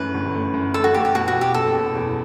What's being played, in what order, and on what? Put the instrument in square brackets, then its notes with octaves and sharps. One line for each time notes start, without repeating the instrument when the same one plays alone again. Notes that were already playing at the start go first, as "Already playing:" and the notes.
Already playing: [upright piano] F#2 E3 A3 [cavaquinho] B4
[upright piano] G1
A3
F#2
[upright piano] F#2 [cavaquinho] A4
[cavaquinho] F#4
[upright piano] A3 [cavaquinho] G4
[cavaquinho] G4
[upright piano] B2 [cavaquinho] F#4
[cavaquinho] F#4
[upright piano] E2
[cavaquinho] G4
[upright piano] F#1 [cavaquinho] A4
[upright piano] B2
E2